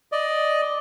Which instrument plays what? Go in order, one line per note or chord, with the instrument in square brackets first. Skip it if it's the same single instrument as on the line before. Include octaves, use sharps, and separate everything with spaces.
[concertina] D5 D#5